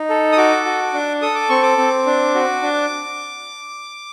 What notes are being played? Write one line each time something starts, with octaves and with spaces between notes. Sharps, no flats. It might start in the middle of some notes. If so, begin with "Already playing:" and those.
Already playing: D#4
A4
D#6
F#4 D6
F#4
D4
A4 D#6
D6
C4 C#6
D6
C4
D4
F#4
D4